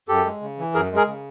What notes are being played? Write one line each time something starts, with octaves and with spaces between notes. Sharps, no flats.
F#2 G4 A4
G#3
C#3
E3
F#2 G#4 A#4
G#3 G#4 A#4
C#3